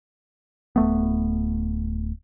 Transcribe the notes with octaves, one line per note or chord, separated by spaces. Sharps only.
D1 A3 B3